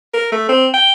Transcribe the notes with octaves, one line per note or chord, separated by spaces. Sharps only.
A#4
A3
C4
G5